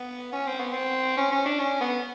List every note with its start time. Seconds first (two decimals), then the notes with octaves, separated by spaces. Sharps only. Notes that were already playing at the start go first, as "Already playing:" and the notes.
Already playing: B3
0.33 C#4
0.46 C4
0.60 B3
0.73 C4
1.17 C#4
1.32 C#4
1.45 D4
1.59 C#4
1.81 B3